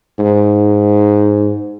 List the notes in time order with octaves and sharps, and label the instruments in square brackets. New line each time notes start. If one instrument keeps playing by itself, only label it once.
[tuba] G#2